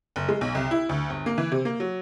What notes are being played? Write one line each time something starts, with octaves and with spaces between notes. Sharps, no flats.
F#1
G#3
B1
C2
E4
D2
G1
A#3
E3
C3
A#3
F#3